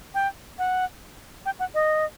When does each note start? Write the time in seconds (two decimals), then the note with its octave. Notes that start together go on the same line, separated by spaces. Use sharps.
0.15 G5
0.59 F#5
1.46 G5
1.60 F#5
1.75 D#5